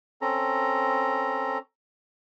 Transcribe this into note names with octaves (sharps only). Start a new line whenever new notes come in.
C4 C#4 A4 A#5